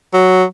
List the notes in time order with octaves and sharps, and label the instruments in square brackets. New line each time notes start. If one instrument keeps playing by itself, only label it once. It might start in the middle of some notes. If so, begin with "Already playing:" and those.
[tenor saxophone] F#3